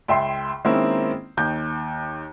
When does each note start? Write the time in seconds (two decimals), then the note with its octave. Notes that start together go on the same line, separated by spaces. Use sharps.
0.08 C#2 E5 G5 C6 C7
0.65 D#3 G#3 A#3 C4 C#4 E4
1.37 D#2 D#3 G6